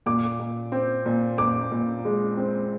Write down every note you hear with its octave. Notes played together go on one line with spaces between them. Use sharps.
A#2 D6
A#2
C4
A#2
A#2 D6
A#2
G#3
C4